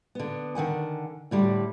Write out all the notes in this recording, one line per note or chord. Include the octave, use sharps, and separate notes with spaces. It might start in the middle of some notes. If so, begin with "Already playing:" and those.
D3 B3
D3 D#3 F#5 G#5
A2 D3 G3